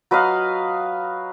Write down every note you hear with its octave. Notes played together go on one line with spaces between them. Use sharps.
F#3 B4 D#5 F5